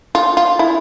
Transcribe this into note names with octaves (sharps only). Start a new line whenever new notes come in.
F4
F4
E4